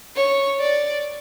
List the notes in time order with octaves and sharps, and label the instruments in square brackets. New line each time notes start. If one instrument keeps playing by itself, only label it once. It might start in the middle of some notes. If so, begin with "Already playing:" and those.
[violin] C#5
D5